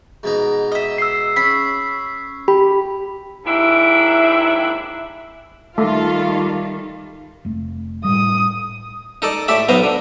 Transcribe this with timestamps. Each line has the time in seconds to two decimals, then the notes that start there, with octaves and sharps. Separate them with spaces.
0.23 G#2 B2 D#4
0.72 D#5 E5
0.98 E6 C7
1.36 C#4 B5
2.48 G4 B5
3.46 D#2 G#2 D4 E4 E5
5.78 D#3 G3 A3 F4 A4 F5
7.45 F1 A3
8.04 A2 G3 D#6
9.22 D#4 A4 D5
9.48 A2 G4 D5 E5
9.69 B1 B3 C5 A#5 D#6
9.84 D3